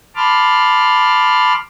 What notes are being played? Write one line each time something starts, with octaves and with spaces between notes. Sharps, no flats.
A5 B5 C6 D6 F6